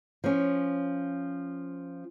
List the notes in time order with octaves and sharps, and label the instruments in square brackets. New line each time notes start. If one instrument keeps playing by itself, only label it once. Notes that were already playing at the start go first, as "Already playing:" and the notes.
[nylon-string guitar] F3 C#4